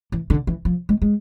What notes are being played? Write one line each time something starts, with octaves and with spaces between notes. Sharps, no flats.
E3
D3
E3
F3
G#3
G#3